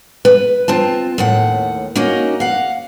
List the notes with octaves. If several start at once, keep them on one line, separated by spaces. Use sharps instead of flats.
B4
C4 F4 A5
D#2 A2 F#5
A#3 C#4 D#4 F#4 D#5
F5 F#5